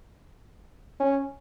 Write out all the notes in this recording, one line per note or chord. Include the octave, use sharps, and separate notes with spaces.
C#4